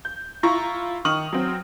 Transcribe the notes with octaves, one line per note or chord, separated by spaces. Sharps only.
G6
E4 F4 A#5 C#6
D#3 C#6 D#6 F6 F#7
F#3 C4